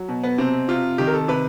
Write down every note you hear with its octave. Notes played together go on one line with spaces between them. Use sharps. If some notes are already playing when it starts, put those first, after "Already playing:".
Already playing: F#3
B2
B3
C3 C4
C3 F4
D#3 G4
A#4
A4
C3 B4